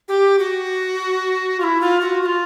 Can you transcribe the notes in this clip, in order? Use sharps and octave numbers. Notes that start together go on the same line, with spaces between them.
G4
F#4
F4
E4
F4
F#4
F#4
F4